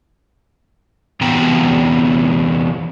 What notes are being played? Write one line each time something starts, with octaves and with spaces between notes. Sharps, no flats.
E2 C3 E3 B3 G5 A#5